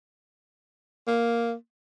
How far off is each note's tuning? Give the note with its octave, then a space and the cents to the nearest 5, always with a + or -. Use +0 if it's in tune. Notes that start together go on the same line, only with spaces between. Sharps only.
A#3 +0